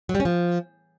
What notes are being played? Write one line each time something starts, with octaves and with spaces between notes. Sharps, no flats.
F#3
G3
C#4
F3